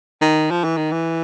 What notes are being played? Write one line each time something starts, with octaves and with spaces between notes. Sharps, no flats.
D#3
F3
E3
D#3
E3